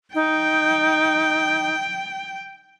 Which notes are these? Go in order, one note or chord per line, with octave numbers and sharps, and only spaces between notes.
D#4 G5